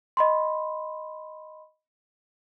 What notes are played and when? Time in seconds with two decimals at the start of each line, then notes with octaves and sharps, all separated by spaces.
0.17 D#5 B5 C6